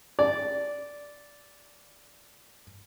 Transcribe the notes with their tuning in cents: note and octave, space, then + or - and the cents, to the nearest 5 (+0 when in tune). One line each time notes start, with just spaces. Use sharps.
D5 -10